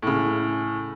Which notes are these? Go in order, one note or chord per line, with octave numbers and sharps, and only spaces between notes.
A2 C#3